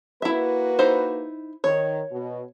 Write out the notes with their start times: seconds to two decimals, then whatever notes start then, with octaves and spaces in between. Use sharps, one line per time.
0.22 A#3 E4 F#4 B4 E5
0.79 D#4 E4 C5
1.64 D#3 C#5
2.11 B2